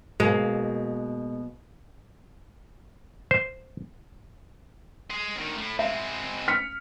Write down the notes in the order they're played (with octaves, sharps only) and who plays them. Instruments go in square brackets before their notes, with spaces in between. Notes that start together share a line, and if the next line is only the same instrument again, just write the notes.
[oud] B2 A#3 [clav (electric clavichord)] G#3
[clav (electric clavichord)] C5
[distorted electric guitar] D#5 C6
D2 D#3
A2 A3
[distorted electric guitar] G#3 C4 [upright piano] E5
[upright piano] F6 B6 C#7